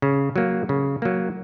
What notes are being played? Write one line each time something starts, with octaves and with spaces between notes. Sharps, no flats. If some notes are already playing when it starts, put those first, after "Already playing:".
C#3
F#3 A#3
C#3
F#3 A#3